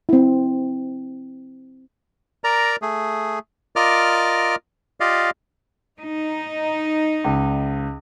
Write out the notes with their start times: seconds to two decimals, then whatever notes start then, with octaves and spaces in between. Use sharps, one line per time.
0.09 C4 E4
2.44 A#4 D5 A#5
2.82 A3 G#4
3.76 F4 A#4 D5 D#5 D6 F6
5.00 F4 G4 D5 D#5 F5
5.99 D#4
7.24 C#2